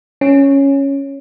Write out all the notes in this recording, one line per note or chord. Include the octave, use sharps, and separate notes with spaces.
C#4